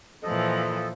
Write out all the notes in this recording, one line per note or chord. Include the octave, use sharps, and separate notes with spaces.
A#2 E3 F3 A4 D#5